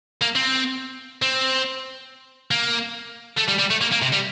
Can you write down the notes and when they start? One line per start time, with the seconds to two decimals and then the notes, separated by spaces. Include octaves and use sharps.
0.22 A#3
0.36 C4
1.22 C4
2.51 A#3
3.38 A3
3.49 G3
3.59 G3
3.71 A3
3.81 A#3
3.92 A#3
4.02 C3
4.13 G3